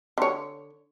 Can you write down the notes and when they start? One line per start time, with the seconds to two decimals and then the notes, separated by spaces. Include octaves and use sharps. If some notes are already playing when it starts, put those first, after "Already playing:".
0.18 D3 C#5